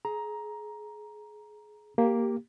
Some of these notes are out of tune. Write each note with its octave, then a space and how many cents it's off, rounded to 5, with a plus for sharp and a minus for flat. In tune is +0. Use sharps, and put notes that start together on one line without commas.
G#4 +25 A#5 +10
A#3 +0 G4 +0